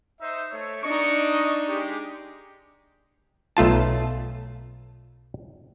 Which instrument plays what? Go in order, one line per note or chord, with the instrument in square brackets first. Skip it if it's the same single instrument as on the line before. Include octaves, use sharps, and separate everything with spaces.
[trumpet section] D#4 C5 E5
A3 C#5
[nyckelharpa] D4 D#4 [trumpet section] D#5 C#6
[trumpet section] G#3 G4
[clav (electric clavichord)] B1 A3 F4 A5